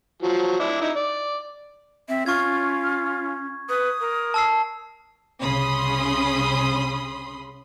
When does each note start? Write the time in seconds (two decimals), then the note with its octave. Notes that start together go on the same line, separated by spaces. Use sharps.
0.22 F3 F#3
0.59 D4 E4
0.81 D#4 E4
0.96 D5
2.09 C4 E5
2.26 C#4 F4 C#6 G#6
3.69 B4 D#6
4.01 A#4
4.34 A5 E6 C7
5.41 C2 C#3 C#4 B5 C6 D#6